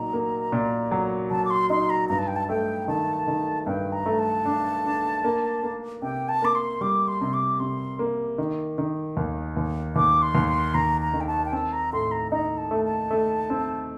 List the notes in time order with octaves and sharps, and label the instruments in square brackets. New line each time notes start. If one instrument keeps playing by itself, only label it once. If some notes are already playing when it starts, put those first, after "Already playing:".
Already playing: [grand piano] A#2 F#3 D#4 [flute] A#5
[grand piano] A#3
A#2
F#3
[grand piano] F#3 [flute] A5
[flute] D6
C6
[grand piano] D#4 [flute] C6
[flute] A#5
[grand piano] G2 [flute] A#5
[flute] A5
G5
A5
[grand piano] A3 [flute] G5
[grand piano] D#3 [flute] A5
[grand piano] D#3
[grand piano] G2 [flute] G5
[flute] A#5
[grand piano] A3
[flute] A5
[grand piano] D4
D4
A#3
A#3
[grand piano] C3 [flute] G5
[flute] A5
[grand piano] A#3 [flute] D6
[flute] C6
[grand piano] G3 [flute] D6
[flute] C6
[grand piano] C3
[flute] D6
[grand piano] C3 [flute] C6
[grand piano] A#3
D#3
D#3
D#2
D#2
[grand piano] D#2 [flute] D6
[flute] C6
[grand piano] D#2
[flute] C6
[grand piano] D#2 [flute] A#5
[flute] A#5
[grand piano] D#3
[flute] G5
A5
G5
[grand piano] C4 [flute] A5
[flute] A#5
[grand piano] A2 [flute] C6
[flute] A#5
[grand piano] D#4 [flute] A#5
[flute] A5
[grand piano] A3
[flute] A5
[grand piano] A3
C4